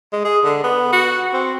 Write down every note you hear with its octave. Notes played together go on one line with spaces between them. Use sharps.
G#3
G#4
D3
B3
F#4
C4